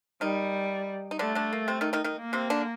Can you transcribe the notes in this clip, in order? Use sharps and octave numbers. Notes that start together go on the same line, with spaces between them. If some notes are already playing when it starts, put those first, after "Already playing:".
D#3 G3 D#4
D#4
D3 A3 D4
D3 D4
A#3
C3 C4
D#3 D#4
D#3 D#4
D#3 D#4
A#3
C3 C4
D3 D4